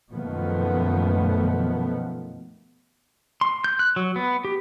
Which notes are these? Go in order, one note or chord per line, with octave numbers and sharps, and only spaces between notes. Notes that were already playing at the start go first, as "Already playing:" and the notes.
F#2 B2 D#3 F3 A3 B3
C6
G6
F#6
F#3
B3
G4